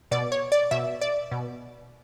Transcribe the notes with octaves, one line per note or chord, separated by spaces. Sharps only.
B2 D5
C#5
D5
B2 E5
D5
B2